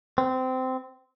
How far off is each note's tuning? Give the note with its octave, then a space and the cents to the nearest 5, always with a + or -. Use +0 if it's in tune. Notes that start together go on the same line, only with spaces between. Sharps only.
C4 -20